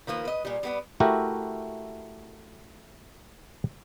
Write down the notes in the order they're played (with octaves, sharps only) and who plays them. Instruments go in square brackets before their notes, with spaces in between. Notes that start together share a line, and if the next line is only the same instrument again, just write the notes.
[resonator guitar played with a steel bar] D#3 F3 A#3 B4
B4 D#5
A#2 G3
G3 B3 B4
[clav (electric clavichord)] A3 E4 F#4 G4 A#4